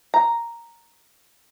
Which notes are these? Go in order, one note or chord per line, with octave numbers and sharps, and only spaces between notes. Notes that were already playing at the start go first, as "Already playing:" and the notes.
A#5